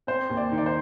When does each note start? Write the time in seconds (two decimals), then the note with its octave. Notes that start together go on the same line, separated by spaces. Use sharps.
0.07 C4 C5
0.29 D#2
0.37 D5
0.52 D#3
0.58 D5
0.66 C5